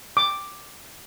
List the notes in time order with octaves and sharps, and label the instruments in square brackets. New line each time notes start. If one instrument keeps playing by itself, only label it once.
[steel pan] D6